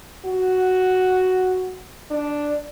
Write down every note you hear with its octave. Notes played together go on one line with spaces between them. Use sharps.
F#4
D4